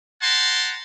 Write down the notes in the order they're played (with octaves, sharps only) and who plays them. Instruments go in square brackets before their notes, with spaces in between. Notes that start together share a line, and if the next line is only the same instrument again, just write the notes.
[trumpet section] F#5 G5 A5 A#5 C6